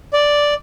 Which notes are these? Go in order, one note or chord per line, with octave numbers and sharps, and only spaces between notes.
D5